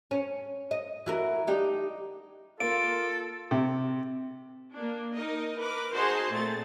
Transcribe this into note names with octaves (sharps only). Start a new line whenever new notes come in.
C#4
D#5
E3 F#4 A#4
D4 D#4 G4
A#3 F4 A4 D7
C3
A#3 D4
D#4 A#4 D#5
A#4 B4 D6
D#4 F#4 G#4 C5 A5 C6
A#2 A3 C4 A6